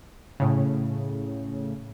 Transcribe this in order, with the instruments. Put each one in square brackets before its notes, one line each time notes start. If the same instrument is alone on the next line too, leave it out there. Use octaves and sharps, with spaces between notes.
[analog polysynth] A2 C#3